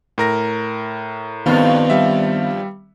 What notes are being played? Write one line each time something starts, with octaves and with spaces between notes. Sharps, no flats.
A2 A#4 A#6
G2 D#3 F3 B3 C4 F4
G3 E5